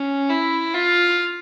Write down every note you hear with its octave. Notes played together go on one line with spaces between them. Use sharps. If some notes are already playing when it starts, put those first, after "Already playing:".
Already playing: C#4
E4
F4